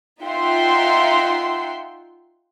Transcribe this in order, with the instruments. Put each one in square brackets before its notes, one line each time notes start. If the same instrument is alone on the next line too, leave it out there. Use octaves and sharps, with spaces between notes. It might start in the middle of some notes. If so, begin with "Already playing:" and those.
[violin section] D#4 F4 E5 F#5 G5 C6